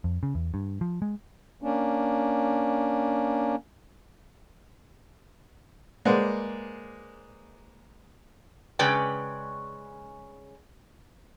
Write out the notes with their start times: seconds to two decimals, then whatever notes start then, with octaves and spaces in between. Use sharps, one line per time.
0.04 F2
0.23 C#3
0.35 E2
0.54 G2
0.81 F3
1.02 G#3
1.62 A#3 C#4 D4
6.05 G#3 A#3 B4 C5 D5 F#5
8.79 C#3 G#3 C#4 B4 D5 G5